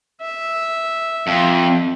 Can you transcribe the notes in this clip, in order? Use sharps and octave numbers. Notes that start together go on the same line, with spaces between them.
E5
F2